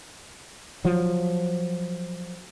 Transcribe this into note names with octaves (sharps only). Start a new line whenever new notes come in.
F3 F#3